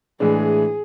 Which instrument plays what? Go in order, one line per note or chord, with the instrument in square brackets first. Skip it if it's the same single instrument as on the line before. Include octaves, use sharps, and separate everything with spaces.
[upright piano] A2 E3 G#3 D4 [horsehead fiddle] G#4